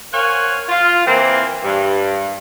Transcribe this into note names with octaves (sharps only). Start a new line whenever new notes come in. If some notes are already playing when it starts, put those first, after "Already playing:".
A#4 C5 C#5 F5 F#5 G#5
F4
E3 A#3 C4
G2